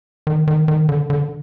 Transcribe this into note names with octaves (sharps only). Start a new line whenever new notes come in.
D#3
D#3
D#3
D3
D3